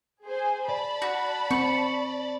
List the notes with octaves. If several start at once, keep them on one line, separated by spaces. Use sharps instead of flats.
G#4 C5 G#5
D5 A5 B5
F#4
C4 C#6